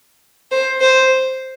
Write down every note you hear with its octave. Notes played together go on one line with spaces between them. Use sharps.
C5
C5